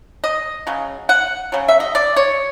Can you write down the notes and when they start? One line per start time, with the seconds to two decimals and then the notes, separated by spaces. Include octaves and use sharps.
0.24 D#5
0.67 C#3 F#3
1.09 F#5
1.52 C#3 F#3
1.68 E5
1.80 D#5
1.95 D5
2.16 C#5